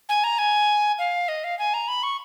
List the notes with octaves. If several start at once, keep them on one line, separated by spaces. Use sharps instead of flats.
G#5
A#5
G#5
F5
D#5
F5
G#5
A#5
B5
C#6